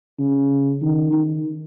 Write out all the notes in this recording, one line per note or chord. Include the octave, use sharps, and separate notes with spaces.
C#3
D#3
D#3